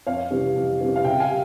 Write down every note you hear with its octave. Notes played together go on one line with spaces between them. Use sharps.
F2 C#5 F5
C3 E3 G3 C#4
F2
C3 E3 G3 C#4
F5
C#3 E5 G5
F5 G#5
G3